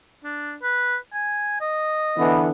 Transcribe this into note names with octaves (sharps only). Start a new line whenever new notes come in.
D4
B4
G#5
D#5
D3 E3 B3